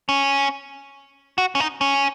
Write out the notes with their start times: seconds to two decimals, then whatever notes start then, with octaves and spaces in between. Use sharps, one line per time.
0.09 C#4
1.38 F#4
1.55 C#4
1.60 D#4
1.81 C#4